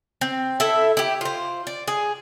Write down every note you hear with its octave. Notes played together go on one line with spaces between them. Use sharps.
C4
E4 A4 E5
E4 G4
F4 C5
D5
G#4